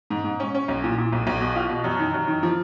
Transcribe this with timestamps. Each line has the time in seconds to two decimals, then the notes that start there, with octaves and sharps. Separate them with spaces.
0.10 G#2
0.25 G#2
0.40 C#4
0.55 C#4
0.68 B1
0.84 A#2
0.98 A#2
1.13 B1
1.27 B1
1.41 B2
1.56 F4
1.70 B2
1.84 F#2
1.99 D#3
2.14 F#2
2.28 D#3
2.43 F3